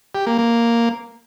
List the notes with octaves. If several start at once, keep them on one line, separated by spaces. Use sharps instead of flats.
G4
A#3
A#3